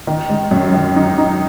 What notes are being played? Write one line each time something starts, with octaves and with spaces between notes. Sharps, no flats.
D#3
G#3
F#2
D#3
D#4
D#4